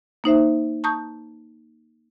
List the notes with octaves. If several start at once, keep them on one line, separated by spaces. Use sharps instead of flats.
A#3 D#4 C5 E5
A5 A#5 C#6 D#6 G6